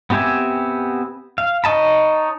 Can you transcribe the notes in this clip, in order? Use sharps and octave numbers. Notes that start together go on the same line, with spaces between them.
B3 C4 G4 E5 G#5
F5
D#4 C#5 D#5 A5 B5